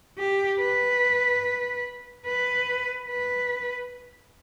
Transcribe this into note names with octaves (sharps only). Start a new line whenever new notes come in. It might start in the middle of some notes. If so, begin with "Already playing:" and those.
G4
B4
B4
B4